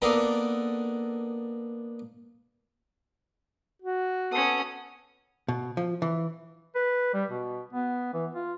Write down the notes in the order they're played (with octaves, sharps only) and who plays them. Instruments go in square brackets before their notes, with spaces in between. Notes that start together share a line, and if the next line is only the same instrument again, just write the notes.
[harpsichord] A#3 B3 D4 D#4 A4 A#4
[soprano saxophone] F#4
[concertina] B3 A4 [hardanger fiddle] C#4 D#6
[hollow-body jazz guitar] B2
F3
E3
[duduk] B4
G3
B2
B3
E3
F4